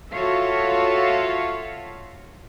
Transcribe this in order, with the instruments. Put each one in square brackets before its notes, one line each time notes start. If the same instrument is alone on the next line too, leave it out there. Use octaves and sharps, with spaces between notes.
[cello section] F4 F#4 A4 C#5 E5 F5